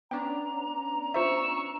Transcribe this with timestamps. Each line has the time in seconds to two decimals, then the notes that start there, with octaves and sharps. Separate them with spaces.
0.11 B3 C#4 D4 G5 A#5
1.14 F4 C5 E5 C#6 E6